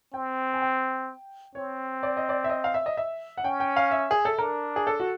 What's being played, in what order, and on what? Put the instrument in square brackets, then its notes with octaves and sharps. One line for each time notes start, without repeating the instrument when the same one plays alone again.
[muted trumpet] C4 [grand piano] G5
[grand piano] G#5
G5
[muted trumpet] C4 [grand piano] C#5
[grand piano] D5
D#5
D5
E5
D#5
F5
E5
D#5
E5
F#5
[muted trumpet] C#4 [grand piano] G5
[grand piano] G5
F5
E5
G#4
A4
[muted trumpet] D4 [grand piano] A#4
[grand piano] G#4
A4
F#4